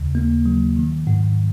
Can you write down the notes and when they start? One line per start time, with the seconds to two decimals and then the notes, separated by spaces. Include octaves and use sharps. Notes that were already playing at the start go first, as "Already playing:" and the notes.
Already playing: D#2 C#3
0.15 A#3
0.46 F#3
0.76 D#3
1.07 G#2